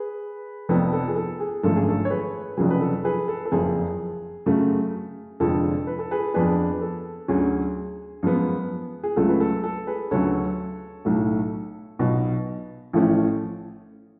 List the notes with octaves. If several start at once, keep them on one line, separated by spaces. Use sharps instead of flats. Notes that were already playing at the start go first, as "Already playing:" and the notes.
Already playing: G#4 B4
F1 F2 F3 B3 A4
A4
G#4
A4
G#4
G#1 F#2 D3 F3 A3 A4
G#4
A4
C#5
G#4 B4
F1 F2 C#3 F#3 G#4
B4
A4
G#4 B4
A4
A4
F#1 F2 F3 G#4
F#2 C#3 F#3 A3
F1 F2 D3 F3 G#3 A4
B4
A4
G#4 B4
F2 F3 B3 D4 G#4 B4
A4
D2 D3 F#3 C#4 G#4
F#2 F3 G#3 B3
G#4
C#2 C#3 F#3 A3 A4
B4
A4
A4
G#4 B4
D2 C#3 F#3 C#4 A4 C#5
B1 A2 F#3 A3
B1 B2 F#3
A1 A2 F3 A3 C#4